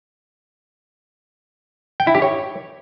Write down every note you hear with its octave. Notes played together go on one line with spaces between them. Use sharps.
G5
E4
G4
C#5